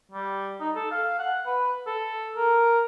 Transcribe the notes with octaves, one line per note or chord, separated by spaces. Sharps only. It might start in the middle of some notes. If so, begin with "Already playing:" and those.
G3
D#4
A4
F5
F#5
B4
A4
A#4